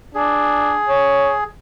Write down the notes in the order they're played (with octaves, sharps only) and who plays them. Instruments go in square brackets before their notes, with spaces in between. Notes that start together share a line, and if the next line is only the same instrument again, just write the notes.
[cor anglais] D4 [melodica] G#4
[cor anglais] C#5